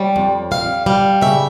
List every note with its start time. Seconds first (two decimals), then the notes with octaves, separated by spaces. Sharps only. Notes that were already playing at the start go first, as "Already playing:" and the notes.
Already playing: G3 C#5
0.16 F2
0.51 G3 F5
0.86 G3 F5
1.21 C#3 E5